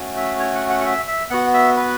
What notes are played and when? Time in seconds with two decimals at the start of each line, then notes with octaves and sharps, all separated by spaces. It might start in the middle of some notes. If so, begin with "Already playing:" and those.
Already playing: A3 C#4 F#4
0.17 E5
0.39 C#5
0.55 F#5
0.70 F#5
0.81 F#5
0.85 E5
1.08 E5
1.30 B3 F#4 F#5
1.54 E5
1.77 B4